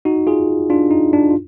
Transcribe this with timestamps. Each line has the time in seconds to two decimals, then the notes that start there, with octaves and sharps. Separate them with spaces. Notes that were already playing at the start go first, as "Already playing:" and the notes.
0.05 D#4 F#4
0.27 F4 G#4
0.70 D4 F4
0.91 D#4
1.13 D4
1.30 F4